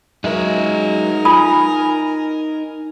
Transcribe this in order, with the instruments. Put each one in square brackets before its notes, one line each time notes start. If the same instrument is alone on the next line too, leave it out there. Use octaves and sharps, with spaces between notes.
[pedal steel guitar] F#3 G#3 [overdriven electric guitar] D#4 E5 [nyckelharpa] A#4
[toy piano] F4 B5 D#6 [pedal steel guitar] G#5